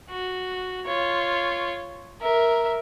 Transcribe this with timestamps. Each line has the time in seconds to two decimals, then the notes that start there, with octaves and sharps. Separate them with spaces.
0.10 F#4
0.86 F4 C#5
2.21 A#4 E5